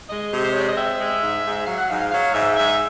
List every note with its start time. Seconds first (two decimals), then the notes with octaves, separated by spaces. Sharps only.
0.10 G#3 D#5
0.32 C3
0.44 C5
0.53 G#3 C#5
0.61 D5
0.69 D#5
0.77 C4 E5
1.00 G#3
1.22 G#2
1.44 G#2
1.67 F#3 F5
1.78 F#5
1.89 G#2 F5
2.01 F5
2.12 F#3 F5
2.34 G#2 E5
2.57 G#2 E5